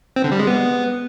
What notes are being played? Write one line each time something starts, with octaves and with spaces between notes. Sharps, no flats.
C4
D3
G3
G#3
B3